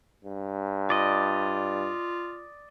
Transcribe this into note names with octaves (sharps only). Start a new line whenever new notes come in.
G2
F4 D5 D#5